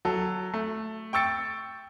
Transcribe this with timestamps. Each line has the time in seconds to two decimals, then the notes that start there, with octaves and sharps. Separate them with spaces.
0.05 F#3 A4
0.54 A3
1.13 G5 C#6 E6 A6 C#7